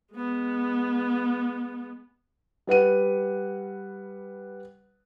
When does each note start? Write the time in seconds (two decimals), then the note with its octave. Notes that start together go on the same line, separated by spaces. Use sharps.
0.14 G#3 B3
2.67 G3 B4 F#5 D#7